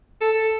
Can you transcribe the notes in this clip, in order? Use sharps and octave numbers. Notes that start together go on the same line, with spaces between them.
A4